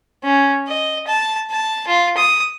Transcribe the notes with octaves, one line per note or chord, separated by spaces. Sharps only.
C#4
D#5
A5
A5
F4
D#6